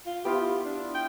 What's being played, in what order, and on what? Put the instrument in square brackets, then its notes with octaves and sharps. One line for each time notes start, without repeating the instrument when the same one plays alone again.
[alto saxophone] F4
[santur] B3 E4 F4 [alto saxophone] G4
[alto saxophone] D4
G5